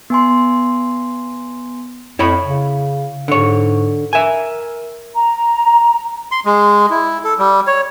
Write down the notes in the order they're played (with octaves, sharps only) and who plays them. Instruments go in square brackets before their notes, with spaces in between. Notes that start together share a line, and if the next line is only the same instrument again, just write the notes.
[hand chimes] B3 G#5 C6
[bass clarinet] F2 [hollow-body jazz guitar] E4 C#5 B5
[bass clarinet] C#3
[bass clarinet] G#2 [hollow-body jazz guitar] D3 C#5
[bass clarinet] A#4 [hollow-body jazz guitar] E5 G#5
[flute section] A#5
[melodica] C6
G#3
E4
A4
G3
C#5